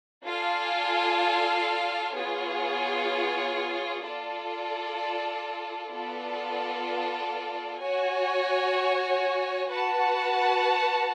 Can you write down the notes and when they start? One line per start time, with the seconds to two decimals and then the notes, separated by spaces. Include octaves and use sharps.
0.24 F4 A4 D5 F5 G#5
2.13 B3 F4 G#4 C#5
4.02 F4 A4 D5
5.91 B3 F4 A4 D5
7.79 F#4 C#5 G#5
9.68 F#4 B4 F#5 A5